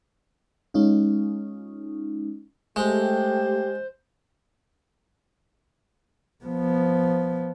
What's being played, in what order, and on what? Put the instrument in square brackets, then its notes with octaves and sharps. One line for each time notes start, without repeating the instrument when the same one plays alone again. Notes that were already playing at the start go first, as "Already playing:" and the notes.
[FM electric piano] G#3 C#4 D#4 F4
[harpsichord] G#3 [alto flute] A3 [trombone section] G4 [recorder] C5
[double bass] F3 B3